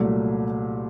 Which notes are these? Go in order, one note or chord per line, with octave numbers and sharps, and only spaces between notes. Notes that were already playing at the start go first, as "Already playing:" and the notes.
Already playing: C2 A#2 F#3 A3